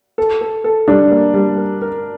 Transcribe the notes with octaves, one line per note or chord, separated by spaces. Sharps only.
A4
A4
A4
G3 D4
A#3
G3
A#4
A#4